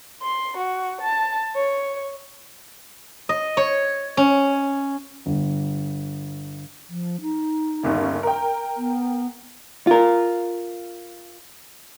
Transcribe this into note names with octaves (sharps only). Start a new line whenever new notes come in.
C6
F#4
A5
C#5
D#5
C#5
C#4
G1
F3
D#4
G1 D#2 C#3
A#4 G5
B3
F4 A#4